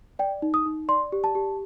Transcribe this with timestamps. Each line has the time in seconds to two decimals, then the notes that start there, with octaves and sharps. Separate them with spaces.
0.19 D5 G5
0.42 D#4
0.54 D#6
0.66 D#4
0.88 D5 C6
1.12 G4
1.24 A5
1.35 G4